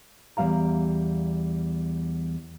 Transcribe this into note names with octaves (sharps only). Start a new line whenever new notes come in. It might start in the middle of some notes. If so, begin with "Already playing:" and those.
E2 F#3 G3 F5 A#5